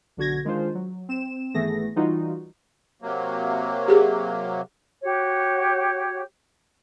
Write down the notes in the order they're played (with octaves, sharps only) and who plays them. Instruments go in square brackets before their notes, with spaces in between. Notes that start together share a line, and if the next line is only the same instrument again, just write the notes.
[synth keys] B1 D3 F#4 G#6 A#6
D#3 G#3 D4 F4 C5
F#3
C4 E7
G#1 E3 A3 B3 G#4 A#6
E3 G3 D#4 F4 F#4
[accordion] C3 F#3 A#3
[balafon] G4 G#4
[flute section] F#4 G4 C#5